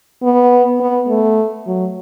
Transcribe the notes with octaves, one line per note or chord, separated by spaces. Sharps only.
B3
B3
A3
F#3